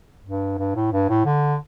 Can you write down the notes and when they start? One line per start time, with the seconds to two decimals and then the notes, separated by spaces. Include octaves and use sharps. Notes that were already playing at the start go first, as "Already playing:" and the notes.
0.24 G2
0.58 G2
0.75 A2
0.92 G2
1.09 A2
1.25 D3